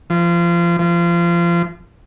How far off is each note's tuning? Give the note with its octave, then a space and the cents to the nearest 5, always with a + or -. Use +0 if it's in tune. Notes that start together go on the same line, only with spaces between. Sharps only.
F3 -30
F3 -30